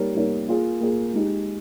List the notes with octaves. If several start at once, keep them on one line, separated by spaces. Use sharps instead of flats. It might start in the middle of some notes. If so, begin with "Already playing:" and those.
Already playing: G3 A#3 D#4 A#4 C#5
G3 A#3 D#4 A#4 C#5
A#3 F4 G#4
A#3 F4 G#4
G#3 D#4 G4